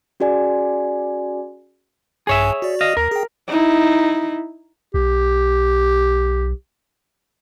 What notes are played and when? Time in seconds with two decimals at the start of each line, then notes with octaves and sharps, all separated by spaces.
0.20 C#4 F#4 G#4 D5 G#5
2.27 A#1 G2 G#4 C#5 E5 G#5
2.62 F#4 D5
2.81 D#5 F5
2.97 D#2 A#4
3.11 G#4 G5
3.47 D#4 E4
4.94 B1 G4